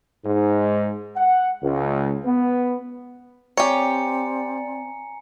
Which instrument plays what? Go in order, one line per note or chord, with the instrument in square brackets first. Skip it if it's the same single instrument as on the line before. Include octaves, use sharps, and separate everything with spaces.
[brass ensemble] G#2
F#5
C#2
B3
[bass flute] C4 [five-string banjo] G4 C#5 [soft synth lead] D5 [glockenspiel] G#5 A#5 C#7